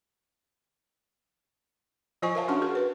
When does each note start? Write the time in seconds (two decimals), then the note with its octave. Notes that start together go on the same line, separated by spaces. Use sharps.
2.22 F3 F4 C5 D#5 G#5 C#6
2.35 A#4 C#5 E5 F5 A5
2.48 C#4 D4 F#4 F#5 A5 C#6
2.62 F#4 G#4 A#4
2.75 B4